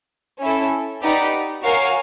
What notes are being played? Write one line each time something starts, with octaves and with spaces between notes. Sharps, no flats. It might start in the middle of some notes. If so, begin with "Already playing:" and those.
C#4 E4 A4
D#4 G4 B4 D5 F#5
F#4 A#4 C#5 F5 G#5